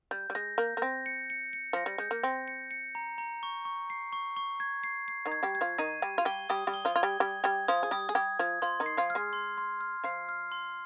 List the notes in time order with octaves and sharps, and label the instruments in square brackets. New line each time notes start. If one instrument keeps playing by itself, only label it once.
[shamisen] G3 [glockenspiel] G6
[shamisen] G3
[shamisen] G#3 [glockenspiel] A#6
[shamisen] A#3 [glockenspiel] G6
[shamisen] A#3
[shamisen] C4 [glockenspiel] A#6
[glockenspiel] C#7
C#7
C#7
[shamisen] F3 [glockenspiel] A#6
[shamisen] G3
[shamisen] G#3 [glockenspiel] G6
[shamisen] A#3
[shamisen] C4 [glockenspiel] A#6
[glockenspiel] C#7
C#7
A#5
A#5
C#6
C#6
C7
C#6
C#6
G#6
C7
C7
[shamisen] D#3 D#4
[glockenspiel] G#6
[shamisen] G3 G4
[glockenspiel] G#6
[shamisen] F3 F4
[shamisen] D#3 D#4 [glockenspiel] D#7
[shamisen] G3 G4 [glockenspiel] D#7
[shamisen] F4
[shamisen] G3 G4 [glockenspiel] G7
[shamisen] G3 G4 [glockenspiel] D#6
[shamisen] G3 G4
[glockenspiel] G7
[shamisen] F3 F4
[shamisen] F4 [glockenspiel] G#6
[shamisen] G3 G4
[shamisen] G3 G4 [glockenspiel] G#6
[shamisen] G3 G4 [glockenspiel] G#6
[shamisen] F3 F4 [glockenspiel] D#6
[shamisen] G#4
[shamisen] G3 G4 [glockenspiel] D#6
[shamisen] G#4
[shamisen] G3 G4 [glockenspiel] G#6
[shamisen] F3 F4 [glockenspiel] G#6
[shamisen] F3 F4 [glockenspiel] C6
[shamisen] D#3 D#4
[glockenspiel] C7
[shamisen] F3 F4
[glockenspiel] F6
[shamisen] G#3 G#4
[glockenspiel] C6
C6
F6
[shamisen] F3 F4 [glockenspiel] C7
[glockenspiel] F6
C6